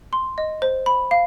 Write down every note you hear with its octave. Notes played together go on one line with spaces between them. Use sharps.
C6
D#5
C5
B5
F5